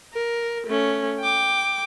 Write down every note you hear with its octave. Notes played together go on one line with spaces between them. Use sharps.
A#4
A3 C#4
G5 D6